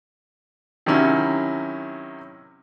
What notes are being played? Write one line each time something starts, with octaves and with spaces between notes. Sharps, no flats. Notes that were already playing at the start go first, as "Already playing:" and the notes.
C3 D#3 F#3 C#4 E4